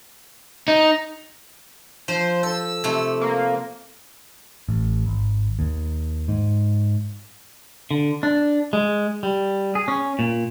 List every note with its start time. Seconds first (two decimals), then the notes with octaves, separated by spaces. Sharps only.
0.68 D#4
2.08 F3 C5
2.43 A4 E6
2.84 C3 A3
3.21 A#3
4.69 A1
5.06 G#1
5.59 D#2
6.28 G#2
7.91 D3
8.23 D4
8.73 G#3
9.23 G3
9.75 G#4
9.88 C#4
10.19 A#2